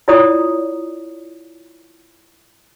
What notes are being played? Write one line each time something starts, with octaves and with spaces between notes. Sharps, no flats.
E4 F4 C#5 D5 A#5 D#6